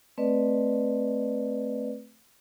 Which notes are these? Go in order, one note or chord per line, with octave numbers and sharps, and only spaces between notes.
A3 C4 B4 D5 D#5